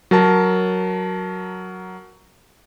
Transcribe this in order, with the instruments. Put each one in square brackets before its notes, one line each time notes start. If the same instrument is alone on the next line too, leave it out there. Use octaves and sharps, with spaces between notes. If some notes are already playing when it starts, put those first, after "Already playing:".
[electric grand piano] F#3 A#4 A5